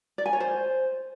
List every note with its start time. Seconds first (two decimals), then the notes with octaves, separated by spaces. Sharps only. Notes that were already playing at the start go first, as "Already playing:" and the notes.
0.18 D5
0.26 G#5
0.33 C#5
0.40 C5